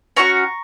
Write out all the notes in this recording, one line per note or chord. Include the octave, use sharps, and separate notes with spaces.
C#4 F#4 A#5 C#6